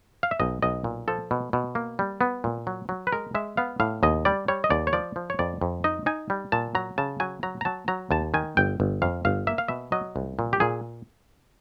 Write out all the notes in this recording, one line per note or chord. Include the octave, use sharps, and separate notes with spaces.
F5
E5
B1 D#5
B1 D#5
A#2
F3 A4
B2
B2
A#3
G3
B3
A#2
F#3
F#3
B4
G#3 A#4
G#3 E5
B3 F5
A2 F5
D#2 D#5
G3 D5
G3 C#5
D#5
D#2 D5
C#5
F3 D5
F3
C#5
F2 D5
F2
D#4 D#5
D#4 G#5
G3
A#2 A5
F#3 A#5
C#3 A5
F#3 G#5
F#3 A#5
A#5
F#3 A5
F#3 A#5
D#2 A5
D#3 G#5
G1 G5
G1
F2 F5
G1 F5
A#3 E5
F5
B2 E5
F#3 D#5
C2
A#2
G4
A#2 G#4